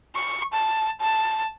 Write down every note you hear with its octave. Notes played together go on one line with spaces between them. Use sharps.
C#6
A5
A5